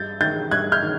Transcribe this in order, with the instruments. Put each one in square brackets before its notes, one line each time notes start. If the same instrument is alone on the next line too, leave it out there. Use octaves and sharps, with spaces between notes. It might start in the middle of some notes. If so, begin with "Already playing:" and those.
Already playing: [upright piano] G2 G6 A6
D#3 G6 A6
G2 F#6 G#6
F6 G6
D#3